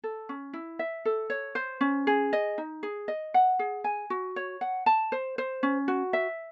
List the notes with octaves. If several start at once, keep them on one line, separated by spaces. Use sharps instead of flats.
A4
C#4
E4
E5
A4
C#5
C5
C#4
G#4
D#5
D#4
G#4
D#5
F#5
G#4
G#5
F#4
C#5
F#5
A5
C5
C5
C#4
F#4
E5